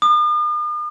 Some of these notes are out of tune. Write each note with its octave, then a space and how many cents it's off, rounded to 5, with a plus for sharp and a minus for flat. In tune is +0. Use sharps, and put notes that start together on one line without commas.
D#6 -45